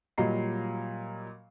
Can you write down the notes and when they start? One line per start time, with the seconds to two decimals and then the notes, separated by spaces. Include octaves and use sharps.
0.18 A#2 F#3 G3 D#5 A#5 C7